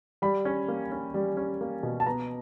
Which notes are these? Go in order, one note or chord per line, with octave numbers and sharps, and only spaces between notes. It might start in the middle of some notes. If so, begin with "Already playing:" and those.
G3 B5
C#4
A#3
C#4
G3
C#4
A#3
B2
A5
B3 A#5